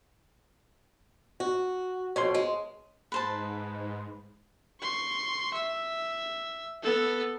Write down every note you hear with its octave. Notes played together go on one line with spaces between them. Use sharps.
F#4
F2 B2 C#5 C6
G#3
G#2 B4 C5 A5
C6 C#6
E5
B3 A4